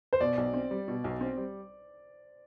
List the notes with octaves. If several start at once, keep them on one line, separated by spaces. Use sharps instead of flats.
C5
B2 D5
B1
C4
G3
B2
B1
C4
G3